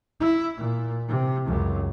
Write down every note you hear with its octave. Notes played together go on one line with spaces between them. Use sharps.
E4
A#2
C3
C#2 F#2